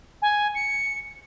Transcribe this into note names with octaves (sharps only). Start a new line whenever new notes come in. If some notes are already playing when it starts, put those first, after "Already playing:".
G#5
C#7